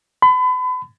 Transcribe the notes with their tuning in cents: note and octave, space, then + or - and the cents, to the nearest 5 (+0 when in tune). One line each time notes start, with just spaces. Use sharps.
B5 +35